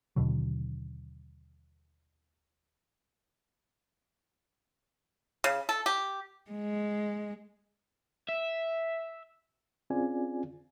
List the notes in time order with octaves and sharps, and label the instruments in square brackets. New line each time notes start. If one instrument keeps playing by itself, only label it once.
[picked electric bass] D#2 B2 D3 F#3
[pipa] C#3
A4
G4
[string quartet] G#3
[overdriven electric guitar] E5
[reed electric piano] C4 C#4 F4 G#4 D5 G#5